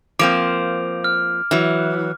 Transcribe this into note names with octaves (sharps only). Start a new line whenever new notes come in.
F3 A#3 C4 D6 D7 F7
F6
E3 F#3